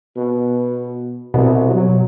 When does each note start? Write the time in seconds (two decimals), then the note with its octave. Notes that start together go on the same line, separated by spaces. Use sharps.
0.16 B2
1.34 C2 B2
1.70 F#3